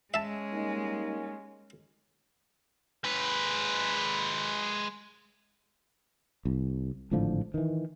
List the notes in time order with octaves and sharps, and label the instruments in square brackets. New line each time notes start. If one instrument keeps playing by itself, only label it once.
[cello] G#3 [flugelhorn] C#4 [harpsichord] E5 A5
[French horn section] G3 A#3 D#4
[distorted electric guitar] G#3 B4
[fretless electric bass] C2
G#1 A2 D3 F3
D#3 E3